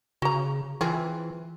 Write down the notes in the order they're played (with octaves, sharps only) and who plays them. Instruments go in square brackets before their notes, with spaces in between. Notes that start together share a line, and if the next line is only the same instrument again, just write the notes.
[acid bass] C#3 [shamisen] F#4 A#5
[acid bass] E3 [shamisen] C4 F4 G#4